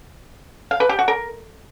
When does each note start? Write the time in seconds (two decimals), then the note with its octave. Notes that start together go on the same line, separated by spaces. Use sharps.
0.71 F5
0.80 B4
0.89 G4
0.99 F#4
1.08 A#4